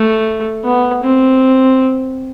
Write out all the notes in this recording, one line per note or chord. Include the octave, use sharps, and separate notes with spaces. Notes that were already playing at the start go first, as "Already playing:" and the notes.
Already playing: A3
B3
C4